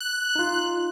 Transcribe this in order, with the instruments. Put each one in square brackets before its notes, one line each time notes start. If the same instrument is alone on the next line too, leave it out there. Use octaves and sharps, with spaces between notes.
[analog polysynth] F#6
[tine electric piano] D#4 F4